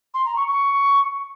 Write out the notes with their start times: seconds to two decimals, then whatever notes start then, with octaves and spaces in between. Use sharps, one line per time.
0.14 C6
0.25 A#5
0.36 C#6
0.47 C#6